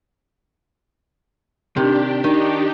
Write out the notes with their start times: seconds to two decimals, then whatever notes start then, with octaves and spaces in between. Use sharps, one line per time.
1.77 C3 D#3 D4 G4
2.24 D#3 D4 D#4 G4